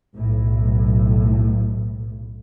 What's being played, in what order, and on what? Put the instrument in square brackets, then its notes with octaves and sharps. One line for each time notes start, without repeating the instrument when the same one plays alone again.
[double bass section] B1 A2